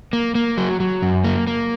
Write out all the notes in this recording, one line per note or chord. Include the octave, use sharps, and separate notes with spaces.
A#3
A#3
F#3
F#3
F#2
A#3
A#3